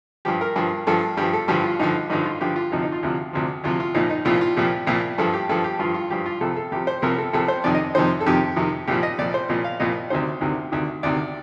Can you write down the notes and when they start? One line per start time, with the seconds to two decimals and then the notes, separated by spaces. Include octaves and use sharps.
0.25 G2 F3 G4
0.41 A#4
0.56 G2 F3
0.87 G2 F3 A4
1.17 G2 F3 G4
1.33 A4
1.48 G2 D3 F3 G4
1.63 F4
1.80 G2 D3 F3 D#4
2.10 G2 D3 F3 D#4
2.25 F4
2.41 G2 D3 F3 G4
2.56 F4
2.72 D2 C3 F3 D#4
2.82 D#4
2.92 F4
3.03 D2 C3 F3
3.33 D2 C3 F3
3.64 D2 C3 F3 F4
3.80 F4
3.94 C2 A#2 F3 D#4
4.10 D#4
4.25 C2 A#2 F3 F4
4.41 F4
4.56 C2 A#2 F3 G4
4.87 C2 A#2 F3
5.18 G2 F3 A4
5.33 G4
5.49 G2 F3 A4
5.64 G4
5.79 G2 F3 F4
5.94 F4
6.10 G2 F3 G4
6.26 F4
6.40 C2 C3 F3 A4
6.56 A4
6.71 C2 C3 F3 G4
6.87 C5
7.02 C2 C3 F3 A#4
7.18 A4
7.33 C2 C3 F3 A4
7.48 C5
7.64 F2 C3 D#3 D5
7.74 D#5
7.95 F2 C3 D#3 C5
8.20 A4
8.26 F2 C3 D#3 G4
8.56 F2 C3 D#3
8.87 C2 A#2 F3 G4
9.03 D#5
9.18 C2 A#2 F3 D5
9.34 C5
9.49 C2 A#2 F3 D#5
9.64 F5
9.80 C2 A#2 F3 D#5
10.10 D2 C3 D#3 C5
10.41 D2 C3 D#3
10.72 D2 C3 D#3
11.03 D2 C3 D#3 D5